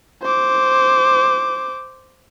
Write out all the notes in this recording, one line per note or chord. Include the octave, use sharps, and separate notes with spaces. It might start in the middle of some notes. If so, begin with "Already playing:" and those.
C5 D6